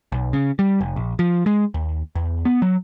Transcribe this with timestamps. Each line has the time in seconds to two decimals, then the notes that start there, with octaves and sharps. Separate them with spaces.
0.12 B1
0.33 C#3
0.59 G3
0.81 F1
0.96 A#1
1.19 F3
1.46 G#3
1.74 D#2
2.15 E2
2.45 B3
2.62 F#3